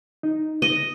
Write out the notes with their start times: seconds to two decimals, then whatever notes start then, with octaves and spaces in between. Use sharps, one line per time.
0.23 D#4
0.62 D#5